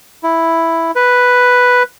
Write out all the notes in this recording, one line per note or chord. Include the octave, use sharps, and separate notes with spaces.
E4
B4